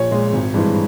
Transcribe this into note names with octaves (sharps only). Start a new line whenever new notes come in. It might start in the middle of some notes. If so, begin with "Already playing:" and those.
Already playing: A#1 C#5
A#2 G#3
G#1
G2 E3 G#3